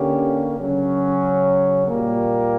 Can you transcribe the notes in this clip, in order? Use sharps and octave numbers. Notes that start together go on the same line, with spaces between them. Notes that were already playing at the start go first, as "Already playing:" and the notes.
Already playing: D3 A#3 C#4 G4
C#3 F#3 C#4
A#2 G3 A#3